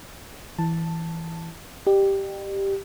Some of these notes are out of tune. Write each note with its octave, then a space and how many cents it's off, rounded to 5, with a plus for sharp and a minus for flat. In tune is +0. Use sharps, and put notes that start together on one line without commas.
E3 +0 A5 +5
G4 +0 D5 +45